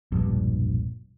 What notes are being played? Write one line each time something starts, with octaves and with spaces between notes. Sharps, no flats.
E1 A#1 G2